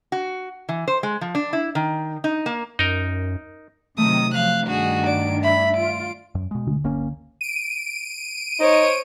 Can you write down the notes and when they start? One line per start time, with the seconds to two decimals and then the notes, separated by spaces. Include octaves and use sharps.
0.12 F#4
0.69 E3
0.88 C5
1.03 G#3
1.21 F3
1.35 D4
1.53 E4
1.75 D#3
2.24 D#4
2.46 A#3
2.79 F#2 D#4 A#4
3.98 C3 D#3 F#3 A3 D#6
4.33 F3 F#3 F5 F#6
4.67 G2 D#3 D4 F#4 G#4
5.06 D5 D7
5.43 E5 B5
5.77 F4 D7
6.35 F#2
6.51 B2 G#3
6.67 D2
6.84 G1 A#3 C#4
7.41 D7 D#7
8.60 D#4 C5 C#5